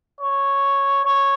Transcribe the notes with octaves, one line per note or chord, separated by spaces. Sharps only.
C#5
C#5